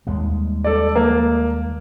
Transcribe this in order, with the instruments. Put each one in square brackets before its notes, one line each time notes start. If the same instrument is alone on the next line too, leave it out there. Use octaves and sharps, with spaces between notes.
[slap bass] D#2 G3 G#3
[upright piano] A4 D5
A#3